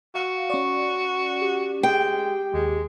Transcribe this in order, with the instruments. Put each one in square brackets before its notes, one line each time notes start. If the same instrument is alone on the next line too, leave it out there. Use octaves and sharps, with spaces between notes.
[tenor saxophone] F#4 [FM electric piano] F5
[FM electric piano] C#4 D5 [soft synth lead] C#6
[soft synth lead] G4
[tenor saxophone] G#3 [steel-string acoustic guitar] G5
[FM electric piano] D#2 [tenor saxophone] G#3